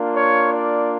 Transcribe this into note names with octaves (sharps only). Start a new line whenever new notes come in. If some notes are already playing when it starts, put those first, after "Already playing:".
Already playing: A#3 D4 F4
C#5
D5